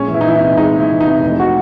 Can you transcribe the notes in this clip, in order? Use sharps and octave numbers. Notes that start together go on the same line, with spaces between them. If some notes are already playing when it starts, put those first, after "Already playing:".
Already playing: A#1 G#3 C#4
E3
E4
D#4
E3 E4
E4
C3
G#3 D#4
G#3
E4
E3
D#4
C3
F1
F#4